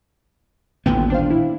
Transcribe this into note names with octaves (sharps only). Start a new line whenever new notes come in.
D#1 A1 A#2 D3 B3 G5
D4 C5 F5
E4